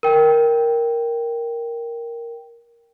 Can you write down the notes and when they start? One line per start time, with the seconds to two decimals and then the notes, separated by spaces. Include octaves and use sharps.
0.03 A#4 G5